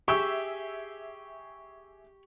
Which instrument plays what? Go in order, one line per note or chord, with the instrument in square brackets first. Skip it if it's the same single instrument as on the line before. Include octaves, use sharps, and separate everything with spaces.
[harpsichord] G4 [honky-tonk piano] G#4 E5 E6 [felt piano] C#6